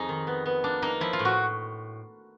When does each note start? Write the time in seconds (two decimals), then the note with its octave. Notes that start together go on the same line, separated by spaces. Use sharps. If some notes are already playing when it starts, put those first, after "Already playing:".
Already playing: F2 D#4 G#4
0.09 D#3
0.27 B3
0.46 B3
0.64 A#3 D4
0.82 A#3 D#4
1.01 F3 E4
1.13 F4
1.19 A2
1.25 F#4